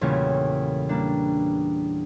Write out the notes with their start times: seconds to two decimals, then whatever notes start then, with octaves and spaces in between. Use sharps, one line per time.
0.01 E2 A#2 C#3 G3 A3 C#4
0.89 G3 A#3 D4